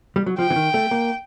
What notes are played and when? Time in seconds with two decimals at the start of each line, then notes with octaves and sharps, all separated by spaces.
0.16 G3
0.26 F#3
0.38 F3 G5
0.50 E3
0.56 D#3
0.74 A3
0.91 A#3